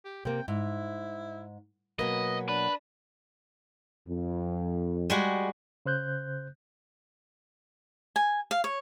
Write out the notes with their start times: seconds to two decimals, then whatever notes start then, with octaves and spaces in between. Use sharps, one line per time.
0.05 G4
0.25 C3 A#3 G5
0.48 G#2 E4
1.99 B2 F#3 A#3 B4 D#5
2.49 D4 B4
4.08 F2
5.10 G3 G#3 F#4
5.86 C#3 C5 F#6 G6
8.16 G#5
8.51 F5
8.64 C#5